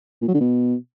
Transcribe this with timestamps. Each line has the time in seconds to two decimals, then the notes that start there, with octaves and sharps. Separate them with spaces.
0.22 A#2
0.28 F#3
0.34 D3
0.41 B2